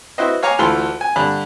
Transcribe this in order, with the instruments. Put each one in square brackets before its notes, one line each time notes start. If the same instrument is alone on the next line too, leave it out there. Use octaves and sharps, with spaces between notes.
[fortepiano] E4 F#4 B4 C5 D#5
C#5 F5 G#5 A#5 C#6 D6
D2 E3 F4 A4 B5 C6
G#5
G2 D3 B5